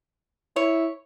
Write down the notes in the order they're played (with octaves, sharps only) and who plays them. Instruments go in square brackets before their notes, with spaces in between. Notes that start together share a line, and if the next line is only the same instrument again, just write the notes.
[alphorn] E4 [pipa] C#5